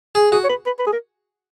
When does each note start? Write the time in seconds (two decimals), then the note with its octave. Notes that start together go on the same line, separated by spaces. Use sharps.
0.15 G#4
0.32 F#4 G#4
0.44 C#5
0.50 B4
0.66 B4
0.79 B4
0.87 G#4
0.93 A#4